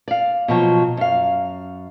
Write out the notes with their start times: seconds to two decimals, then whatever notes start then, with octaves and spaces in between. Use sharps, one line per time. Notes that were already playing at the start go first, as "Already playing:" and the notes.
0.08 D5 F5
0.48 B2 F3 F#3
0.97 F#2 F5